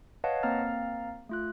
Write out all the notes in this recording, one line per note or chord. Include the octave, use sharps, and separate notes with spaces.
B4 C#5 D#5 F5 F#5 A5
A#3 C4 F5 A#5 F6 A6
A3 F4 F#6